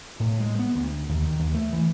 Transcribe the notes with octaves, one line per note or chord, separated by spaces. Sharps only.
A2
G#3
B3
D2
D#2
D#3
D#2
A3
E3